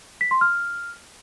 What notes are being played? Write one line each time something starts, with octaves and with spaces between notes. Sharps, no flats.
B6
C6
F6